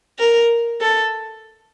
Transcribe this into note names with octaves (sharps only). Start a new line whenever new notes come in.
A#4
A4